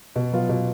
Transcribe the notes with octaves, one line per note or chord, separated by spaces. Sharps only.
B2
F#3 B3 F4
B2